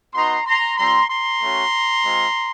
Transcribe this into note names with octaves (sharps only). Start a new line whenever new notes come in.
B3 D#4 F#4 A#5 C6
A#5 C6
G3 C4 F4 A#5 C6
A#5 C6
A3 C#4 F#4
G#3 C4 F4